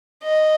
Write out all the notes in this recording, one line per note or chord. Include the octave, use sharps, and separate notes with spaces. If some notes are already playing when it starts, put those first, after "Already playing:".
D#5